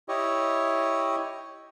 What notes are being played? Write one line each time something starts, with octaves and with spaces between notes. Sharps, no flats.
E4 G4 C#5 D#5